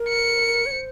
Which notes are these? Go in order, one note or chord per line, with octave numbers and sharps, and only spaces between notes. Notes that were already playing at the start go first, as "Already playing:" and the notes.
Already playing: A#4
C#7
C#5
C5